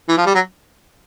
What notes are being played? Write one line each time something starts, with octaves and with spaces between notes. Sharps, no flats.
E3
F3
G3
F#3